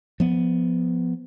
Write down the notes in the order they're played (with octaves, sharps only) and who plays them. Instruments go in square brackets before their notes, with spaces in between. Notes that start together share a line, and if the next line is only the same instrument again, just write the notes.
[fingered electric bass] F3 B3